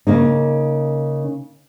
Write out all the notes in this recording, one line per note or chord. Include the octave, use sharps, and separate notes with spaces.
C#3 A#3 D#4